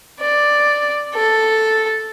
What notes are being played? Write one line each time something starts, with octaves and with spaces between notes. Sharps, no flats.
D5
A4